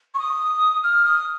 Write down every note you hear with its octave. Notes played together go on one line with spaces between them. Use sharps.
C#6
D#6
F6
D#6